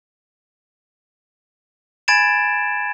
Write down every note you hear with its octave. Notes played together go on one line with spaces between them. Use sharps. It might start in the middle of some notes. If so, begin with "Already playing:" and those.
G#5 B5 G#6 A6 D7 E7